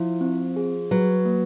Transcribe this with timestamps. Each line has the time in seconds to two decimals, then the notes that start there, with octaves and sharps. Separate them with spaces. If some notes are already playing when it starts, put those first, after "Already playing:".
Already playing: F3 E4
0.21 C4
0.56 G#4
0.91 F#3 B4
1.25 A#3